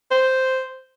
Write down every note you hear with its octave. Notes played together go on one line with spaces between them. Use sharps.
C5